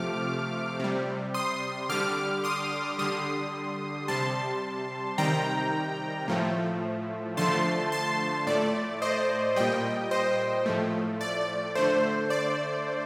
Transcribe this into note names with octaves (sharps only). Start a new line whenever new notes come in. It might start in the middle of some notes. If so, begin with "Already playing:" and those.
Already playing: C3 F3 A3 D6 F6
C3 G3
C6 D#6
D3 G3 D6 F6
C6 D#6
D3 G3 C6 D#6
C3 G3 A5 C6
C3 D#3 G3 G5 A#5
A2 F3 A3
D3 F3 A3 A5 C6
A5 C6
A2 A3 D5
C5 D#5
A#2 G3 D#5 G5
C5 D#5
A2 F3 A3
D5
D3 A3 C5
D5